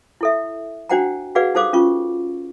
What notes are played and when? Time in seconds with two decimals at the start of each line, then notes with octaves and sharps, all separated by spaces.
0.21 E4 A4 E5
0.89 D4 F#4 C5 F#5 G5 A#5
1.35 F#4 G#4 B4 D5 F5 F#5
1.55 D#4 G4 A4 C5 F5 D6
1.73 C#4 F4 C#6